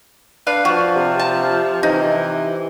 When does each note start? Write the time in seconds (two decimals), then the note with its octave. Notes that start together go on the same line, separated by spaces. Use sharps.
0.47 D4 B4 F5
0.65 F3 F#4
0.96 C3
1.19 A5
1.83 C3 E3 D#4